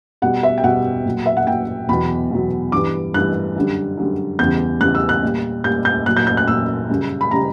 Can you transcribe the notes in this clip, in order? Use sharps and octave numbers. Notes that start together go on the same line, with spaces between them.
B2 G3 F#5
E5
G5
B2 G3 F#5
A#2 F#3
E5
F#5
A#2 F#3 G5
E2 B2 F#3 B5
E2 B2 F#3
G2 E3 G3 D6
G2 E3 G3 F#6
F#2 D3 G3
F#2 D3 G3
E2 C#3 G3 G6
E2 C#3 G3 F#6
E6
F#6
A#2 G3
A#2 G3 G6
G6
A#2 F#3 F#6
G6
G6
F#6
A#2 F#3 E6
F#2 C#3 G3
B5
C#3 G3 A#5